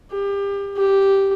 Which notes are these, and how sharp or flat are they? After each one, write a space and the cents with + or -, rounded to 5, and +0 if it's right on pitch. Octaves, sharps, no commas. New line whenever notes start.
G4 +30
G4 -5